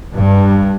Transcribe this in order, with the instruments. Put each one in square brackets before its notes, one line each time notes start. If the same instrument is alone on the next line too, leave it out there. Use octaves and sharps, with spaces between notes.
[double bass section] G2